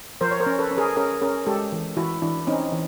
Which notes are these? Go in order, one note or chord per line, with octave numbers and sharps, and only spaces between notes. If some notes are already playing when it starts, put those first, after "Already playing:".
F3 A#4 C5
C#5
A#4 C5
C#4
A4 B4
C#4
G#4 A#4
C#4 G#4 A#4
C#4 G#4 A#4
G#3 G4 A4
E3
E3 E4 F#4
E3 D4 E4
C4 C#4 D#4
E3